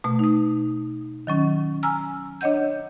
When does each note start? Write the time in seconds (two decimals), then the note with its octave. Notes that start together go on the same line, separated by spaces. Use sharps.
0.04 B2 A3
0.19 D#4 D#6
1.27 D#3 F#3 C#4
1.83 G#5 A#5 E6 F6
2.41 D4 C#5 D#5 F#5 G6